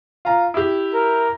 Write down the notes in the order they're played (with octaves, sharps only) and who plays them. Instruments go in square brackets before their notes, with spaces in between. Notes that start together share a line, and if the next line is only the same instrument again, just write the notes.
[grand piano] F4 A#5
E4 G4
[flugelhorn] A#4